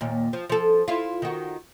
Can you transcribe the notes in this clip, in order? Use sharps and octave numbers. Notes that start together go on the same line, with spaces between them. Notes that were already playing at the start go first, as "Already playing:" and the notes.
D#2 A#2
F3
F3 A4
E4 F4
D#3 F#4